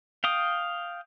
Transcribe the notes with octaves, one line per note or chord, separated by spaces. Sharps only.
F5 G5 D#6